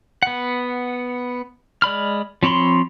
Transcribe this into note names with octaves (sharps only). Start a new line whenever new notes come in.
B3 F#5
G#3 D5 B5 F6
F3 C4 C#5 B5 C6